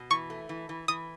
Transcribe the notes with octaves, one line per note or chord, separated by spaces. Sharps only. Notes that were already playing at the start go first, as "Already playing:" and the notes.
Already playing: B2
E3 C#6
A3
E3
E3
E3 D#6